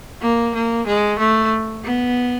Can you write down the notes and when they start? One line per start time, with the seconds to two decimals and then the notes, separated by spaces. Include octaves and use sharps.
0.22 A#3
0.54 A#3
0.87 G#3
1.19 A3
1.84 B3